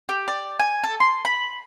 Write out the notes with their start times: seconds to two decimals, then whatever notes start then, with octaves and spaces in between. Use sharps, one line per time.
0.09 G4
0.28 D5
0.59 G#5
0.84 A4
1.00 C6
1.25 B5